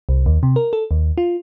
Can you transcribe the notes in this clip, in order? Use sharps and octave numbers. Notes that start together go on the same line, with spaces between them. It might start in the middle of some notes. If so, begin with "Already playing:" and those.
C2
D#2
C3
A#4
A4
D#2
F4